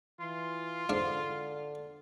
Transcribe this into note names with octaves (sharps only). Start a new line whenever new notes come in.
E3 F4 C6
G#2 D3 D4 F5